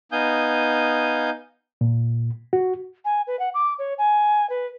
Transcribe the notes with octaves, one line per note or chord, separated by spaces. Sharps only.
B3 D#4 F5 G#5 D#6 G6
A#2
F#4
G#5
B4
F#5
D6
C#5
G#5
B4